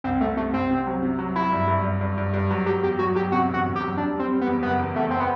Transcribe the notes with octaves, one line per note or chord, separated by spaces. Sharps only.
C2 C4
C2 A3
C3 A3
C2 C4
C3
F#3
C3
F#3
F#3 E4
G2
G2
G2
G2
G2
G2
F#3
F#3 G4
E2 G4
F#3 F#4
F#3 G4
C3 F#4
E1 F#4
E1
G4
F#3
G3 D4
G3
C4
G3
B3
E2
F#1 B3
E2
E2 A3
C4
B3